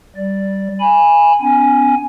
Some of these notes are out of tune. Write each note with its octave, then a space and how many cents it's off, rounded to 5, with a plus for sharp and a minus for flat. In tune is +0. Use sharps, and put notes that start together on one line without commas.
G3 -15 D5 +0
G#5 -10 B5 -10
B3 +40 D4 -45 G#5 +0